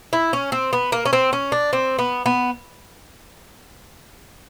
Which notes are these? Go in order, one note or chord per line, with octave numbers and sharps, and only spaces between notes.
E4
C#4
C4
B3
A#3
C#4
C4
C#4
D4
C4
B3
B3